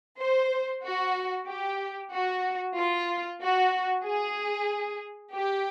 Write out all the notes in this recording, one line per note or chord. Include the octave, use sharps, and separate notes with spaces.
C5
F#4
G4
F#4
F4
F#4
G#4
G4